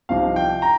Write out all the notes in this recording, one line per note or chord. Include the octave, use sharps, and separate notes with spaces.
C2 C3 F3 D#4 F5
G5
A#5